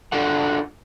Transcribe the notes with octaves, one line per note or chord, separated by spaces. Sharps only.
D4 F4 F#4 A4 F#5